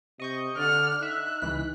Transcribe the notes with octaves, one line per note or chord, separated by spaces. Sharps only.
C3 D#5 C#6 G6
D3 D5 F#5 F6
D#4 E5 F#6
C#2 E3 B6